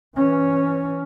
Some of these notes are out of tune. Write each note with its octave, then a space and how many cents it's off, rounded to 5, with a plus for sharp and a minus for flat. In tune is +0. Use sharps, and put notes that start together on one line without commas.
E3 +0 C#4 +0